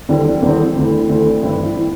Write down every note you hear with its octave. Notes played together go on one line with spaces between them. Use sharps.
E2 D3 G3 C4
E2 D3 G3 C4
D2 D3 C4 E4
D2 D3 C4 E4
G2 E3 C4 E4
E3 C4 E4